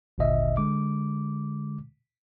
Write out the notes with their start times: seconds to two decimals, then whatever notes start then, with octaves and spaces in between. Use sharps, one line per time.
0.18 G#1 D2 A#2 D3 D#5 E5
0.57 D3 G#3 D6